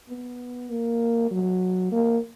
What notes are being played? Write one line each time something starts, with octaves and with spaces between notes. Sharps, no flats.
B3
A#3
F#3
A#3